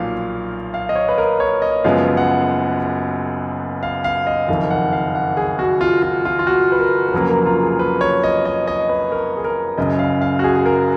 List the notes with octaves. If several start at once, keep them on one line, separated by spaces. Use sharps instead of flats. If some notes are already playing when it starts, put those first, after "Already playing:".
Already playing: B1 A#2 F3 F5
F5
D#5
C#5
B4
A#4
C#5
D#5
F#1 F#2 F3 G#3 B3 F5
F#5
F5
F5
D#5
F#1 F2 D#3 F5
F#5
F5
F#5
G#4
F#4
F4
F4
F4
F4
F#4
B4
A#4
A#4
F1 F2 C#3 F#3 A#3 B4
A#4
F4
G#4
B4
C#5
D#5
D#5
D#5
B4
A#4
G#4
A#4
F#1 F#2 C#3 D#5
F5
F5
F#4
G#4
G#4
A#4